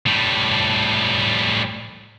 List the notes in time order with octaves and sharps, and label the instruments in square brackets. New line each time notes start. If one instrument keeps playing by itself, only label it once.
[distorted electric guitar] A2 G3